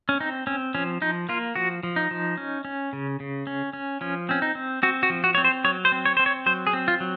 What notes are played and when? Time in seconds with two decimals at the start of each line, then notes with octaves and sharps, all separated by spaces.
0.09 C#4
0.20 C4 D#4
0.47 C4 C#4
0.75 F3 C#4
1.02 F3 D#4
1.29 A#3 F4
1.55 F3 F#4
1.83 F3
1.96 D#4
2.11 F3
2.37 C#4
2.65 C#4
2.93 C#3
3.20 C#3
3.47 C#4
3.73 C#4
4.01 F3 C#4
4.29 C4 C#4
4.42 D#4
4.55 C4
4.83 C4 F#4
5.03 F#4
5.10 F3
5.24 F#4
5.35 C4 C#5
5.44 C5
5.64 F#3 C#5
5.85 C5
5.92 C4
6.06 C#5
6.17 C4 C5
6.26 C#5
6.46 F#3 C5
6.67 G#4
6.73 C4
6.88 F4
7.00 F#3